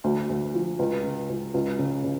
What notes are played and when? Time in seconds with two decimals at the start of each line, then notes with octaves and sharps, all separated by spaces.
0.04 D2
0.29 D2
0.54 F3
0.79 C#2
1.04 C#3
1.30 C#2
1.54 C#2
1.79 C#3
2.04 C#3